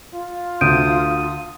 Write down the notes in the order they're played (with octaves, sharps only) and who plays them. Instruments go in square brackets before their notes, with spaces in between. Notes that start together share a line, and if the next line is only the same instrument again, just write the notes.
[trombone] F4
[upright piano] D2 [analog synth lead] D#6 [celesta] G6 D7 D#7